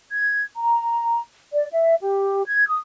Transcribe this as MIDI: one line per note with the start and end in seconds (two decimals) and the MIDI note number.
0.11 0.43 92
0.57 1.20 82
1.53 1.65 74
1.71 1.95 76
2.02 2.42 67
2.47 2.67 92
2.67 2.78 87